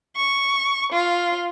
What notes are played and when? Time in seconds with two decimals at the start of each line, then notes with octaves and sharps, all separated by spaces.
0.16 C#6
0.92 F4